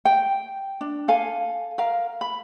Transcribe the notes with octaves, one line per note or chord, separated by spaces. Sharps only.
G5
D4
A4 F5 G#5
A#4 F5
B5